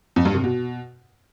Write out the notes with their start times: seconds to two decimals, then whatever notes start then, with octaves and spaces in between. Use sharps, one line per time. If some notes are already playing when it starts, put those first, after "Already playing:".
0.16 F2
0.25 G2
0.35 C3
0.44 B2